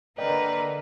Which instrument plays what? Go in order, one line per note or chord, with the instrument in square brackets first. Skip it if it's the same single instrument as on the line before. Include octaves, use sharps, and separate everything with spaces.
[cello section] D3 A#3 [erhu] A#4 [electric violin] B4 [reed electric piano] D5 D#5 G5